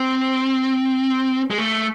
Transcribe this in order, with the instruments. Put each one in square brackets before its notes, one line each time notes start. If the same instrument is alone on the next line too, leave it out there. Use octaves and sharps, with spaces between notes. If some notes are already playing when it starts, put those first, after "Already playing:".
Already playing: [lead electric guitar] C4
G#3
A3